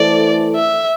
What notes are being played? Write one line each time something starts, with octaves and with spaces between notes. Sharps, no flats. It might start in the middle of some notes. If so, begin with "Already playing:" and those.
Already playing: E3 A3 E4 A4 C5 D5
E5